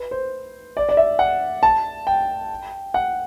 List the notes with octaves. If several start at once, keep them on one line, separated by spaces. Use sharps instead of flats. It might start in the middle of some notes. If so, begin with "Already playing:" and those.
Already playing: B4
C5
D5
D5
E5
F#5
A5
G5
F#5